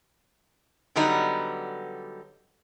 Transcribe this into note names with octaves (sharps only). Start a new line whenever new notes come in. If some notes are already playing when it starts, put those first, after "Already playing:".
D3 F#3 G3 B3 D#4